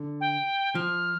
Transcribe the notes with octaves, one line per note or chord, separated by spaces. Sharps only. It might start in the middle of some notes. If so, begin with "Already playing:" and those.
Already playing: D3
G5
F3 F6